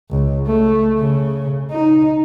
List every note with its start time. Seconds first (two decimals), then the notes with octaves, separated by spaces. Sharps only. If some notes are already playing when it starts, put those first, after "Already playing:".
0.10 C#2
0.46 A3
0.98 C#3
1.72 D#4